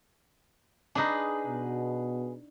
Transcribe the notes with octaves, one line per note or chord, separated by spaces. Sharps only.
D4 D#4 G#4 B4
B2